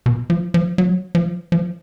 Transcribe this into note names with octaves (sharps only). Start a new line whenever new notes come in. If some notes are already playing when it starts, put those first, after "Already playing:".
B2
F3
F3
F#3
F3
F3